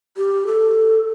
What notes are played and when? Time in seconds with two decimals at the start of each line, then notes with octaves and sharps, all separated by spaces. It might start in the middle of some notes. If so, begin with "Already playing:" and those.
0.17 G4
0.47 A4